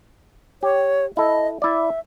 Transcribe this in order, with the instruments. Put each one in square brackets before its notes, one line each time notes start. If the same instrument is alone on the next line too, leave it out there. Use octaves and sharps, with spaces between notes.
[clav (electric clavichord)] G4 [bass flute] C#5
[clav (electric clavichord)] E4 A4 [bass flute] D#5
[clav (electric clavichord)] E4 D5 [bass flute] E5